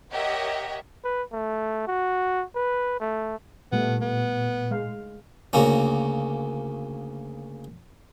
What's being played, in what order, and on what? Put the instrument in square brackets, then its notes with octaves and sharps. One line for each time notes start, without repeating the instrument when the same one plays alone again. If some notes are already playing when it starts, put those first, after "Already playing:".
[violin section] G4 A#4 C#5 D#5 E5 F#5
[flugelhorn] B4
A3
F#4
B4
A3
[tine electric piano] A#2 [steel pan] G3 A3 [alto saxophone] B3
[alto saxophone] B3
[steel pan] G#3 F5
[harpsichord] D2 C#3 A#3 C#4